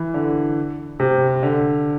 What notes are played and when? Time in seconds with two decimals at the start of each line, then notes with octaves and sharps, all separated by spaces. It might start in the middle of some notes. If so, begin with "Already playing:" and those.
Already playing: E3
0.14 D3
1.00 C3
1.43 D3